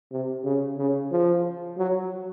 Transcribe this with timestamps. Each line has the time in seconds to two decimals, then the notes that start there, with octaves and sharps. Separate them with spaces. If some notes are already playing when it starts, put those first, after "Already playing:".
0.12 C3
0.45 C#3
0.78 C#3
1.12 F3
1.78 F#3